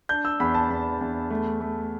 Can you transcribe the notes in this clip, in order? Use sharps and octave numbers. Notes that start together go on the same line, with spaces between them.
D4 G6
E6
E2 B5
A5
E2 B5
E2
A3
A3